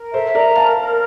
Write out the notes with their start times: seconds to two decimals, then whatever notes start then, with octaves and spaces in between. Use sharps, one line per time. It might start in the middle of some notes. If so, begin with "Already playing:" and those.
Already playing: A#4
0.13 A4 C5 E5
0.35 A#4 D5 A#5
0.56 A#4 F5 A5
0.77 A#4